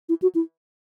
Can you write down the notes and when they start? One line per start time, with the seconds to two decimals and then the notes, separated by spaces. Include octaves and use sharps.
0.09 E4
0.22 F#4
0.35 E4